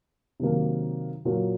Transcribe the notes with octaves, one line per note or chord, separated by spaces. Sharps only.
C3 D#3 F#3 A#3
A#2 F#3 A#3